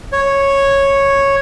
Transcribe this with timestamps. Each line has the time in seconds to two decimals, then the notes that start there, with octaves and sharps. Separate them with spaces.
0.12 C#5